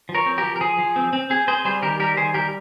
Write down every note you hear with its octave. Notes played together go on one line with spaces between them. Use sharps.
F3
A#4 C#5
C4
G4 A#4
F3
A#4
F3 G#4
F3
C4
C4
C4 G#4
C4 G#4 C5
G3 G#4 C5
D#3 G4 A#4
G3 G4 A#4
D#3 G#4 C5
G3 G4 A#4